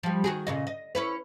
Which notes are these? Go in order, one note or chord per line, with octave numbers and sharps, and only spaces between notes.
F3 G3
D#3 F#4 G#4
A#2 C#3 D#5
D#5
C#4 E4 B4